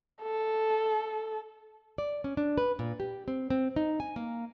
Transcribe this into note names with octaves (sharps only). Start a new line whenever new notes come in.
A4
D5
C#4
D4
B4
A#2
G4
C4
C4
D#4
G#5
A#3